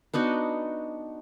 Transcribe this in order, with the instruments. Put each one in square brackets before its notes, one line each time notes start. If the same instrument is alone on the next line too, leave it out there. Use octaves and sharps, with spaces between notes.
[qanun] B3 D4 D#4 F#4